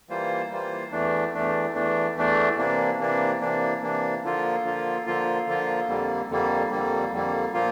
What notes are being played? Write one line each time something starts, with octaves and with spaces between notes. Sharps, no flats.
E3 G3 A#3 F4 C5
E3 G3 A#3 F4 C5
E2 E3 A3 D4
E2 E3 A3 D4
E2 E3 A3 D4
E2 E3 A3 D4
C3 E3 A#3 D4
C3 E3 A#3 D4
C3 E3 A#3 D4
C3 E3 A#3 D4
D3 F3 A#3 F4
D3 F3 A#3 F4
D3 F3 A#3 F4
D3 F3 A#3 F4
F2 D3 G3 A#3
F2 D3 G3 A#3
F2 D3 G3 A#3
F2 D3 G3 A#3
A#2 F3 A#3 F4